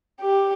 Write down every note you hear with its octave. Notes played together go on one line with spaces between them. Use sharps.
G4